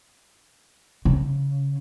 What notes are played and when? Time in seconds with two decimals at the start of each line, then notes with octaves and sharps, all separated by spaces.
1.05 C#3